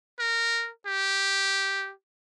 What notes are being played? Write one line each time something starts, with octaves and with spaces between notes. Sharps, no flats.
A#4
G4